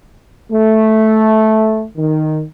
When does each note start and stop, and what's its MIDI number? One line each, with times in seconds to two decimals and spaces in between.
0.52 1.84 57
1.97 2.43 51